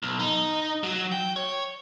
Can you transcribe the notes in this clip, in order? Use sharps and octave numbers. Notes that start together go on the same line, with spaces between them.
B1
D#4
F#3
G5
C#5